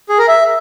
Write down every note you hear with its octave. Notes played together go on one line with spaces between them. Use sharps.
G#4
A#4
E5